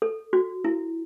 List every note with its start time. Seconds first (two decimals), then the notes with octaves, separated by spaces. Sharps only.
0.02 A4
0.33 F#4
0.65 E4